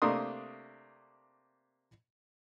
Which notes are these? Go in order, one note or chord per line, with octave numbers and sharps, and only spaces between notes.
C3 A3 A#3 D4 C6 D#6